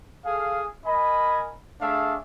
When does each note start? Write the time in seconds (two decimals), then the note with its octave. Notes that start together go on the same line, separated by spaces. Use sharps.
0.25 G#4 A4 F5
0.86 A#4 D#5 G#5 B5
1.82 A3 D4 G#4 E5 F5